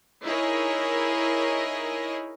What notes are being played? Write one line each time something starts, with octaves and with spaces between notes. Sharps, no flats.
D#4 E4 G#4 A#4 C#5 D#5